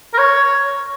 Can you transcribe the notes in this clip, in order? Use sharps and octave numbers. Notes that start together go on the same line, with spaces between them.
A#4
C#5